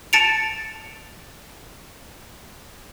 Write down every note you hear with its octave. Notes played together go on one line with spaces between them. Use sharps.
A5 A6 C#7 D7 F7